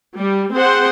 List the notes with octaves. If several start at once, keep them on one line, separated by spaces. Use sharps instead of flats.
G3
C4 G#4 C5 F#5